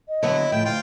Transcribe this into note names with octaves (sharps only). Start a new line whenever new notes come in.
D#5
D3 F#3 B3 E4 C#5
A2 F3 E4 G5
D2 F4 G5